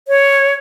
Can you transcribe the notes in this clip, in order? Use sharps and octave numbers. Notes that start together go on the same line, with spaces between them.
C#5